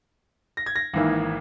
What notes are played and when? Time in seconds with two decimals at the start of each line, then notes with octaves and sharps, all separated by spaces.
0.57 A#6
0.66 G#6
0.76 A#6
0.94 G#1 G#2 E3 A#3 E4